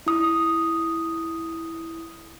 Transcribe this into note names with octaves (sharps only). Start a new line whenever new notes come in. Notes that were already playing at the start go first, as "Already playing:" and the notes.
E4 D#6